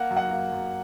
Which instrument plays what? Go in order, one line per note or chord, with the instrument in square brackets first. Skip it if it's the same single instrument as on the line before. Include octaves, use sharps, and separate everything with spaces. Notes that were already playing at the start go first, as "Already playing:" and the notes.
Already playing: [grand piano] A#3 [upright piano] F#5
[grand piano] F#2
[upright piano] F#5
[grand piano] A#3
F#2